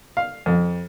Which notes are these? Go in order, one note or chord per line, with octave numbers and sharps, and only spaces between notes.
F5
F2